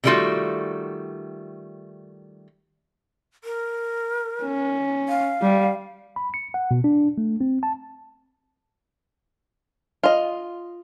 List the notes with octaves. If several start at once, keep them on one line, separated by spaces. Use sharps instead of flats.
C3 D#3 G3 A3 F4 F#4
A#4
C#4
F5
G3
B5
C#7
F#5
B2
D4
A3
C4
A5
F4 D#5